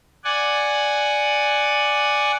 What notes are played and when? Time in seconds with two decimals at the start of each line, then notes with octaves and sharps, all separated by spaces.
0.24 D5 F#5 G#5